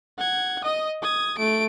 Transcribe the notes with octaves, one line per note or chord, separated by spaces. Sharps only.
F#5 G#6
D#5 D#6
D#6 G#6
A3 D7